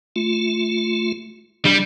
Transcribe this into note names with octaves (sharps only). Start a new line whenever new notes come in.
A3 F4
G3 D4